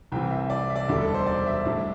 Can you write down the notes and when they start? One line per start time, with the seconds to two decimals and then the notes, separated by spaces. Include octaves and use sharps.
0.12 C2 C3 E3 G5
0.31 E5
0.50 D5
0.70 E5
0.76 D5
0.88 E1 D2 D3 G3 D4 A4
1.01 A4
1.14 C5
1.27 D5
1.46 E5
1.65 A2 G3 D4